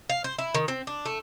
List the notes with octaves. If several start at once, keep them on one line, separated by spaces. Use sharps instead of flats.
F5
C5
E4
D#3
C4
D4
A3